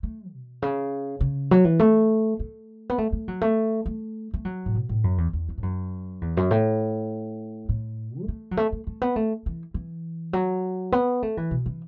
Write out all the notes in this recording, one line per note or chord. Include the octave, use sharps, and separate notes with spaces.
A3
B2
C#3
C#3
F#3
E3
A3
A3
B3
A3
A3
F#3
A3
A3
A3
F#3
A2
B2
A2
F#2
E2
E2
E3
A2
F#2
E2
F#2
A2
A2
B3
A3
F#3
A3
A3
A3
B3
A3
E3
E3
F#3
B3
A3
E3
B2
E3